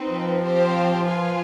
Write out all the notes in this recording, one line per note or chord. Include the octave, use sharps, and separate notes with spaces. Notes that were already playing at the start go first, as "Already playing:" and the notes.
Already playing: C4 D#4 B4
F3
C4 G4 C5 F5
F4 B4 F5 G#5